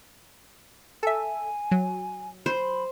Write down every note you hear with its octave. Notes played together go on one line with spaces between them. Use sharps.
A4 E5 G#5
F#3
C5 B5